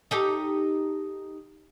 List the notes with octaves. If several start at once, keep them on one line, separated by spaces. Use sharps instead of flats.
D#4 G4 A4